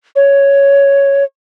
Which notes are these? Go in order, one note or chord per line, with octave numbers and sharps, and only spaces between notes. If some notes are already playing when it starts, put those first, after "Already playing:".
C#5